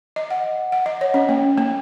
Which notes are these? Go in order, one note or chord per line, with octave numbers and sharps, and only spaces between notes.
D#5
F#5
F#5
D#5
C#5
C#4
A#3
A#3